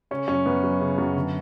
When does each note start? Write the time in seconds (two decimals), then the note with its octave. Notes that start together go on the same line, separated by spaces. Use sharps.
0.11 C#3 C#4
0.28 F#2 C#4
0.46 F#2 B3
0.63 F#3
0.81 C#3
0.98 F#2
1.16 D3